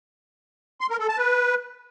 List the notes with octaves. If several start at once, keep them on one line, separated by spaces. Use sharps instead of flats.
C6
A#4
A4
A5
B4